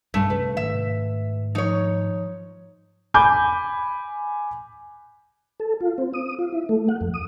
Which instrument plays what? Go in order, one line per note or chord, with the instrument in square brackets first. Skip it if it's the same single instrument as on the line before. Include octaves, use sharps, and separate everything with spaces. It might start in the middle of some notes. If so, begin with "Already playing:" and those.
[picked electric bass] B1 C#4 [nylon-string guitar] G2 A5 [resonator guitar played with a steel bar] A3
[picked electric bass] C3 [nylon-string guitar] B4
[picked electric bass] G#2 D#3 A3 [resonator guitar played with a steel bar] E5
[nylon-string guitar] F3 [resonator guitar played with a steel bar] D#4 C#5
[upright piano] G#5 B5 D6 G6
[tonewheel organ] A4
F4
C4
D#6
F4
E4
A3
F#5
F2
D#6